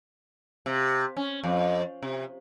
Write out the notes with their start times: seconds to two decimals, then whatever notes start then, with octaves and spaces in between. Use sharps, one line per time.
0.66 C3
1.17 C#4
1.43 F2
2.02 C3